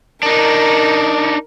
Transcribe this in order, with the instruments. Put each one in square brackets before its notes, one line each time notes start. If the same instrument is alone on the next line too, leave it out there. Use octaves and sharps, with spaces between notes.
[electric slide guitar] D4 D#4 [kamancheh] A#4